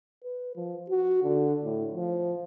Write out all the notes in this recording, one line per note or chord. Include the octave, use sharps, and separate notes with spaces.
B4
F3
F#4
D3
A2
F3